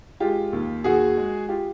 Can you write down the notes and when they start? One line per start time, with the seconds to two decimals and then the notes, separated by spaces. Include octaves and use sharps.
0.20 G#3 F4 G4
0.53 D#2
0.84 D#2 F#4 G#4
1.17 G#3
1.49 F4 G4